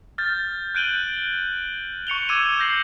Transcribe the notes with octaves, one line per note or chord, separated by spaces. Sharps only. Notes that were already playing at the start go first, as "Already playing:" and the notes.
F6 G6 A6
F#6 G6 D7 D#7 F#7 G7
C#6 C#7 F7 G7
D6 E6 G#6 C#7 D#7 E7
G6 A#6 C7 F#7